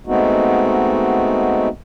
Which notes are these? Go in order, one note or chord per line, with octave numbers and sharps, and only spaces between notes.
G#3 A3 B3 C4 D#4 F#4